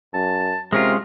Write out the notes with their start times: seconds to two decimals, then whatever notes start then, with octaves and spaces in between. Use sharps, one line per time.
0.14 F#2 A5
0.73 C3 G#3 C#4 F4 A#4